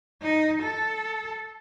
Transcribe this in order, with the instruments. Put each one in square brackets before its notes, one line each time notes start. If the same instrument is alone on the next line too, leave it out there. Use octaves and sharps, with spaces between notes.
[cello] D#4
A4